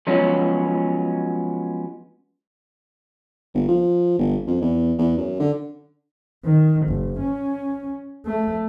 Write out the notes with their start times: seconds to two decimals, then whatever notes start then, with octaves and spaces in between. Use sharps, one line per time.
0.07 F3 F#3 G#3 B3 C#4 F#4
3.55 G1
3.68 F3
4.19 G1
4.47 F2
4.61 E2
4.98 E2
5.18 F#2
5.40 D3
6.45 D#3
6.87 F#1
7.20 C#4
8.26 A3